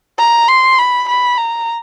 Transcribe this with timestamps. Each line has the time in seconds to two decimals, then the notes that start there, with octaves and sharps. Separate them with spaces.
0.18 A#5
0.49 C6
0.79 B5
1.09 B5
1.38 A#5